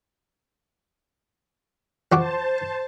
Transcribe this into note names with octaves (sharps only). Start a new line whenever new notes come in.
F2 F#4 C5 A5 D6